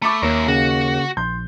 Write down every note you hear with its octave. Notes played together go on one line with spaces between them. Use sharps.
A3 B5 C#6 D6
D#2 A#3 A#4 C#5 E5
C#3 F#4
A#1 C6 G6